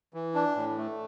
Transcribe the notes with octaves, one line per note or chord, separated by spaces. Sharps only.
E3
D4
A2
A3